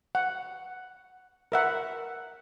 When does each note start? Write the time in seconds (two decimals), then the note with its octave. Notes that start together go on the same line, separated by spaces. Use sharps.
0.15 F#5
1.52 A#4 E5 F#5